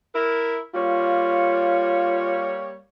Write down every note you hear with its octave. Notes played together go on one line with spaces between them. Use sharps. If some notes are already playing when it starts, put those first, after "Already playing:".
E4 A#4
G3 A#3 F4 C#5